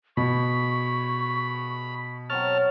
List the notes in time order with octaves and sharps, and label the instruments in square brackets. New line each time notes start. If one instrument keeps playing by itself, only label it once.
[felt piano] B2 [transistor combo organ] B5 [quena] C#6
[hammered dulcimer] F#3 C4 C#5 [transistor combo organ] A5 F6